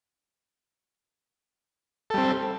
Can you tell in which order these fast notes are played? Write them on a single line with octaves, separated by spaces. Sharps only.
A4 G3 C4